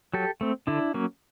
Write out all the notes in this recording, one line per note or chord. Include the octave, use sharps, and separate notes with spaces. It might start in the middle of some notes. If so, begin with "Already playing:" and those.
F#3 G4 A4
A3 C4
D3 D4 E4
F#3 A#3 C#4